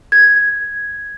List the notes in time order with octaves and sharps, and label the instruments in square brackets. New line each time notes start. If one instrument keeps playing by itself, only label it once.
[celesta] G#6